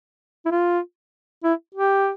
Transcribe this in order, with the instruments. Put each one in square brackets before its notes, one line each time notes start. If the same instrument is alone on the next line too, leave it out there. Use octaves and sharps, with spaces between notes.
[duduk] E4
F4
E4
G4